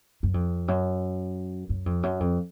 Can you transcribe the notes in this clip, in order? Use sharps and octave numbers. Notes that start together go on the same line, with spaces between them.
F#2
F2
F#2
F#2
F2
F#2
F2